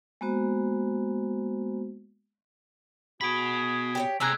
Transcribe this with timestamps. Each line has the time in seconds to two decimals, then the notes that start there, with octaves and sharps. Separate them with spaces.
0.21 G#3 A#3 B3 F#4 C5
3.21 B2 F#4 G#4 B5 B6 D7
3.95 G4 A4 C#5
4.20 C3 G3 G#3 G#4 A#5 E6 F#6 G#6